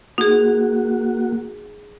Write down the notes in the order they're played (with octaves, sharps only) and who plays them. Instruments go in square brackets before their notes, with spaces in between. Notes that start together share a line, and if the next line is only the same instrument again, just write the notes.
[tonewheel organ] A#3 F#4 [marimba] D#4 G#4